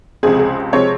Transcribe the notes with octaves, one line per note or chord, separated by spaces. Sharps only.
C#2 C3 F3 G#3 C4 G#4
G#4
C3 F3 G#3 C4 C#5